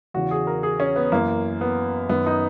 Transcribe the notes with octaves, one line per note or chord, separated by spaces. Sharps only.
E2 C#3 E3 F#4
G#4
A#4
G#4
C#4
B3
F#2 E3 A#3
B3
F#2 D#3 B3
D#4